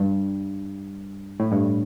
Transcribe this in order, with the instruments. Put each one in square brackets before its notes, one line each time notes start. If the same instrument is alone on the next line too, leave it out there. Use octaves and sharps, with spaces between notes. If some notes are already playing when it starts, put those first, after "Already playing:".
Already playing: [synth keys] G2
A2
G2